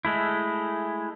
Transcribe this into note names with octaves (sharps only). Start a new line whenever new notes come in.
G#3 A3 E4